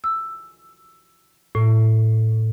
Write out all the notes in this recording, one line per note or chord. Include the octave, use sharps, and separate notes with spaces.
E6
A2